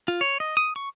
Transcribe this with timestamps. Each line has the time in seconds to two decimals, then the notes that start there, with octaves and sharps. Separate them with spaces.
0.08 F4
0.21 C#5
0.40 D#5
0.57 D#6
0.76 C#6